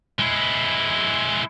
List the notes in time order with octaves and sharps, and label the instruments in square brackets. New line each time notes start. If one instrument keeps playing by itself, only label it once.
[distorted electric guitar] G#3 E4